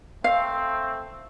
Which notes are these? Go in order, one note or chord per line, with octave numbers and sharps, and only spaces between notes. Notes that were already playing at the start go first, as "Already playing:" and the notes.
A3 C4 F5